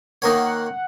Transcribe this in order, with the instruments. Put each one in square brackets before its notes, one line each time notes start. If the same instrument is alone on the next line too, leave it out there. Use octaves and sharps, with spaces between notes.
[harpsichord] D#3 A#3 D#4 A#4 C#5 [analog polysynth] F#5